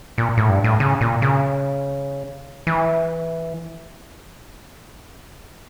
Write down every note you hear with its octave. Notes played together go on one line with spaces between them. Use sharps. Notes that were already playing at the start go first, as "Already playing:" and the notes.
A#2
A2
G2
A2
C#3
A#2
C#3
E3